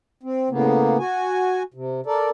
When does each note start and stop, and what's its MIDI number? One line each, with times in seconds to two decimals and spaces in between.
0.23 0.49 60
0.50 0.98 45
0.50 0.98 49
0.50 0.98 58
0.50 0.98 59
0.99 1.63 66
0.99 1.63 80
1.74 2.01 48
2.06 2.30 69
2.06 2.30 70
2.06 2.30 74